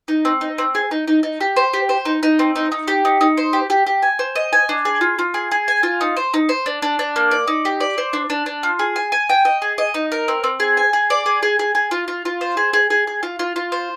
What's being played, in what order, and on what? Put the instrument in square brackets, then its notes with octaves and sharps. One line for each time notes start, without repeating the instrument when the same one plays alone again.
[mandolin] D#4
C4
D#4
C4
G#4
D#4
D#4
D#4
G4
C5
G4
C5
D#4
D#4
C4
D#4
D#4
G4
D#4
D#4
C5
G4
G4
G4
G#5
C5
D#5
G#5
D4
G#4
F4
F4
G#4
G#4
G#5
F4
D#4
C5
D#4
C5
D4
D4
D4
A#3
D5
D#4
G4
D5
C5
D4
D4
D4
F4
G#4
G#5
G#5
G5
D#5
G#4
D#5
D#4
A#4
C4
C4
G#4
G#5
G#4
D5
G#4
G#4
G#4
G#4
F4
F4
F4
C5
G#4
G#4
G#4
G#4
F4
F4
F4
C5